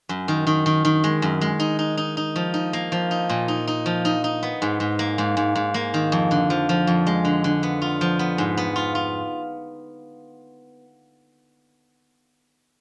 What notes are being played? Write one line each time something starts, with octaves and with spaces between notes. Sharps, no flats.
F#2
D#3
D#3
D#3
D#3
G#3
F#2
G#3
D#4
D#4
D#4
D#4
F3
D#4
A#3
F3
D#4
A#2
D#4
D#4
F3
D#4
D#4
B3
G#2
G#2
A#3
G#2
G#2
G#2
A#3
D#3
F2
D3
F3
F3
F2
G#3
D3
D3
B3
F4
F3
B3
G#2
B3
F4
F4